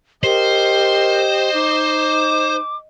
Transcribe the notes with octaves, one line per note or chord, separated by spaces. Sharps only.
G4 A#4 C5 D#5
D#4 D6